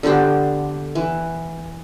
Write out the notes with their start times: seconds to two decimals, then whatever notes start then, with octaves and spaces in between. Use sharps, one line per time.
0.03 D3 B3 G4 C5
0.95 E3